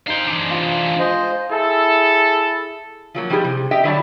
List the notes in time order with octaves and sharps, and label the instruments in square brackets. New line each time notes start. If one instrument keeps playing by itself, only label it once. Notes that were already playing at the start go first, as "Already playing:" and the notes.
[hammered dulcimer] D#4 G#4 C5 [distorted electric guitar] F5 G5
[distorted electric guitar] E3 D4
[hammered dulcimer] F4 C5
G#4
[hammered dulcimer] G#3 F4 [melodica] C5 D#5
[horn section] E4 G#4 A4
[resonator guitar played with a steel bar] F3 F#3 A#3
F3 G3 D#4 E4 G4 G#4
C3
G4 D#5 E5 G5
D3 F#3 G3 E4 D5 A5